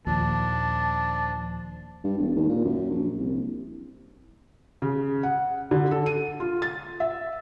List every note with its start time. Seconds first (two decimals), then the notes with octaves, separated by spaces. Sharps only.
0.07 D#2 A#2 F3 D4 A5
2.04 G2
2.18 E1
2.36 D#2
2.49 A#2
2.64 F#2
2.90 A#1
3.18 C2
4.82 C#3
5.23 F#5
5.71 D3
5.91 A4
6.06 D#7
6.40 F4
6.62 A6
7.00 E5